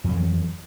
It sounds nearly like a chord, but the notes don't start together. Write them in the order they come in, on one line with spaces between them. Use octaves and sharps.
F2 F#3 E3